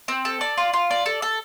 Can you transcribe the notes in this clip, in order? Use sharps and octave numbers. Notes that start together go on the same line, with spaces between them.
C4
A4
D5
F4
F4
D5
A4
A4